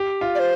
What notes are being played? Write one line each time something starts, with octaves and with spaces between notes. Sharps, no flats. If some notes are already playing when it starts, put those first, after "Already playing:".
Already playing: G4
F4
D5
C5